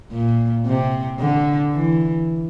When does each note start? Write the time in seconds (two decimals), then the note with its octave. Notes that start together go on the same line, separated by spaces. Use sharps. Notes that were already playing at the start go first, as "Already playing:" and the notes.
0.12 A#2
0.66 C3
1.19 D3
1.73 E3